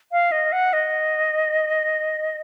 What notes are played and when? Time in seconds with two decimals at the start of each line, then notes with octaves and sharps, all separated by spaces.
0.12 F5
0.32 D#5
0.52 F#5
0.73 D#5